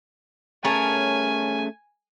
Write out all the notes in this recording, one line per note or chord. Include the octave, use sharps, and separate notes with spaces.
A3 C#4 G#4 A#4 C#5 G#5 A5